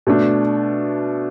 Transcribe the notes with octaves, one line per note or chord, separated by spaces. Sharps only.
B2 A3 D4